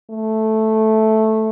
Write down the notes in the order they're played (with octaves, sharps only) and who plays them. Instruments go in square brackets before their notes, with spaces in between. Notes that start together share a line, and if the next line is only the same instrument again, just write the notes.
[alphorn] A3